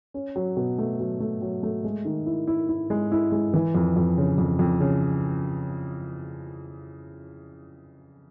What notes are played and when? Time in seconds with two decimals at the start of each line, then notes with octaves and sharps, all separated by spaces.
0.14 C#4
0.36 F#3
0.57 B2
0.78 A3
1.00 F#3
1.20 A3
1.42 F#3
1.63 A3
1.84 G#3
2.05 D#3
2.26 E4
2.47 E4
2.69 E4
2.90 G#3
3.12 E4
3.32 G#3
3.54 E3
3.75 F2
3.96 F2
4.18 C#3
4.38 F2
4.59 F2
4.80 C#3